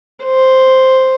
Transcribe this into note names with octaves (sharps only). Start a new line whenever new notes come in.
C5